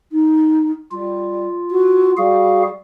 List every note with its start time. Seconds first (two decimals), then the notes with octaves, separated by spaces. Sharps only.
0.12 D#4
0.91 G3 F4
1.70 F#4
2.17 G3 F#4 G#4 F5